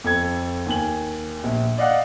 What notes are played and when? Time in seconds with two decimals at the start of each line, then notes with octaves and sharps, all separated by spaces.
0.04 F2 A4 G#6
0.66 D#2 G#5 F#7
1.44 A#1
1.78 D5 D#5 F5 F#5